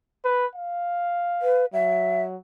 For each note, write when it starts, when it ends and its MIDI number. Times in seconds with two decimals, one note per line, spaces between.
0.24 0.46 71
0.55 1.64 77
1.42 1.66 71
1.73 2.36 54
1.73 2.22 76